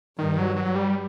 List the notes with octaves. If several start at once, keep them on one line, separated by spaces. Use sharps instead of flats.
G2 D#3
F#3
F#3
G3